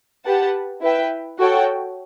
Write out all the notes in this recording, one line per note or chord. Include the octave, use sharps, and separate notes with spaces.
G4 B4 F#5 A5
E4 B4 E5 G5
F#4 A4 C#5 G5